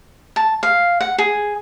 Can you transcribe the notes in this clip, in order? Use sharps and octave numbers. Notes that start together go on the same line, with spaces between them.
A5
F5
F#5
G#4